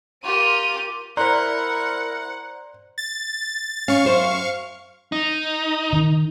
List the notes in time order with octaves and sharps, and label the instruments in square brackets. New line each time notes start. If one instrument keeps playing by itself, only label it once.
[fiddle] F4 G4 [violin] A#4 D#7
[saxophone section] E4 A#4 [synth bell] C5 D5 [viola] F#5 [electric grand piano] A#5 C6 F#6
[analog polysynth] A6
[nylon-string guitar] C#4 [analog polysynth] F5 C#6
[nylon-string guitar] F#2 C5
[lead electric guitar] D#4
[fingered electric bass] D#3